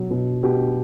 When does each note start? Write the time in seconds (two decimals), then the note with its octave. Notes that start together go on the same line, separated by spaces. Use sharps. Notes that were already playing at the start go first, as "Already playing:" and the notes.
Already playing: B2 F#3
0.11 B2
0.43 B2 G4